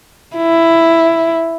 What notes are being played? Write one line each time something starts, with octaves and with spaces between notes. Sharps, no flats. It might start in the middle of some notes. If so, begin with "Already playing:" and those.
E4